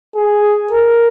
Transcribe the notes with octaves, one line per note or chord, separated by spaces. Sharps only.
G#4
A#4